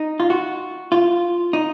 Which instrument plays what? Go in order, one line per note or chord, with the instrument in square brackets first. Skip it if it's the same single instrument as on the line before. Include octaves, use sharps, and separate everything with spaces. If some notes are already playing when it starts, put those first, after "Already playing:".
Already playing: [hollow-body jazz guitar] D#4
F4
F#4
F4
D#4